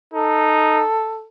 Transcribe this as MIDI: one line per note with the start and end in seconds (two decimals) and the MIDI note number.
0.14 0.83 63
0.14 1.25 69